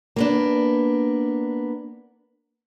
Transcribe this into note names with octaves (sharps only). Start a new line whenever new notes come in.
A#3 B3 D4